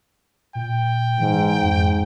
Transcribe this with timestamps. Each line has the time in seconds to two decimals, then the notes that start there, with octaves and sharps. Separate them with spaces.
0.55 A#2 G5
1.20 G#2 E3
1.62 F2 G#2